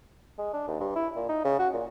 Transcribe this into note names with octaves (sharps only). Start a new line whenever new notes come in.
G#3
D4
D#2
G2
E4
A#2
D#4
C#3
F#4
A#2